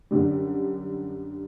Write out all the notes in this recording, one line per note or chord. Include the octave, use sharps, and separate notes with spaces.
F#2 D3 G3